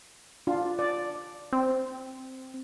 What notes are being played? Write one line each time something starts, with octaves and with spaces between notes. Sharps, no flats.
D4 F4
D5
C4